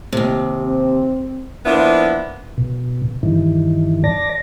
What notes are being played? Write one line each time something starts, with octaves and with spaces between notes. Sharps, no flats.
D#2 C3
C4
F3 A#3 B3 D4 E4
B2
G2 D#3 E3
D5 A5 A#6